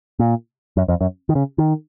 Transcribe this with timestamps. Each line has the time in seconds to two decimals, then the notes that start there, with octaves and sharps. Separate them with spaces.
0.19 A#2
0.77 F#2
0.88 F2
1.01 F#2
1.29 D#3
1.35 C#3
1.58 D#3